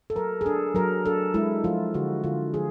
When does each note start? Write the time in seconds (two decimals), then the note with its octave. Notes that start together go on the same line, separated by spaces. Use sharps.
0.10 A4
0.15 F#3 A#4
0.41 G#4
0.46 D4 A4
0.75 F#3 A#4
1.05 D4 A4
1.34 G#3 E4
1.64 F3 F4
1.94 D3 F#4
2.24 D3 F4
2.54 F3 G#4